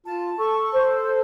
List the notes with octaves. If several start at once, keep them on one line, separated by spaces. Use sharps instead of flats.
F4 A5
A4 C#6
C5